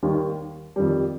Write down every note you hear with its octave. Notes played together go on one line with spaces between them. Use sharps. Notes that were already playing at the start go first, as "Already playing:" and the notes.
D#2 D#3 G3
F2 D#3 G3